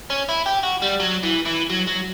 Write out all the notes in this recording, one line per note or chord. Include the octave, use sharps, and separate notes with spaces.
C#4
E4
G4
F#4
G3
F#3
E3
E3
F#3
F#3